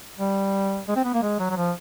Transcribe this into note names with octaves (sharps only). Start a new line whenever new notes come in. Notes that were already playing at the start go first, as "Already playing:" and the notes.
G3
G#3
C4
B3
A#3
G#3
F#3
F#3
F3